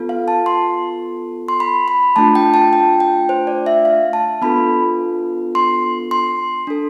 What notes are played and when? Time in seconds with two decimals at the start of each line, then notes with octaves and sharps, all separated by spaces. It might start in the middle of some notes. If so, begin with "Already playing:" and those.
Already playing: B3 F4 A4
0.09 F5
0.28 A5
0.46 C6
1.48 C6
1.60 B5
1.88 B5
2.16 A3 D4 F4 A5
2.35 G5
2.54 A5
2.73 G5
3.00 G5
3.29 C5
3.47 D5
3.66 E5
3.85 F5
4.13 A5
4.42 B3 D4 F4 A4 B5
5.55 C6
6.11 C6
6.67 D4 A4